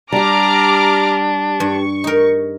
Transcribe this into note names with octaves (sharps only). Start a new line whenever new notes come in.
G3 D4 G4 A#5 D6 F6
G2 C#6
D#4 A#4